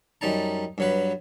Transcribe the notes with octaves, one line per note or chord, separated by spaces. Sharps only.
F#2 G3 D#4 A5 A#5
G2 F#3 B4